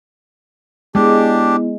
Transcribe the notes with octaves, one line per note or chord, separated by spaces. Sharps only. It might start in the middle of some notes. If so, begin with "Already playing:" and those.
G#3 B3 D4 E4 G4